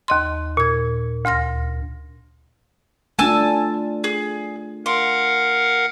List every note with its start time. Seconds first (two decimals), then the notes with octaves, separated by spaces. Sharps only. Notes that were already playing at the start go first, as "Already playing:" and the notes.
0.08 D#2 D#5 C6
0.57 A#2 G#6
1.25 D2 C6 F6 A#6
3.19 A3 D4 F4 G#5 A5 E6
4.04 G#4
4.86 A#4 F5 F#5 C6